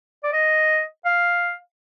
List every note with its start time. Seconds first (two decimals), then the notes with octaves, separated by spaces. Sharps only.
0.24 D5
0.33 D#5
1.05 F5